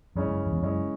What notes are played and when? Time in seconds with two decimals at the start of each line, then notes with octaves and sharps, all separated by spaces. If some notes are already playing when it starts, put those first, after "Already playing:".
0.16 F#2 C#3 G#3 C#4 E4
0.28 F#2
0.46 F#2
0.52 E2
0.62 F#2 C#3 G#3 C#4 E4